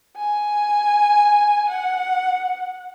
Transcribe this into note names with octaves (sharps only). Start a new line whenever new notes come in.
G#5
F#5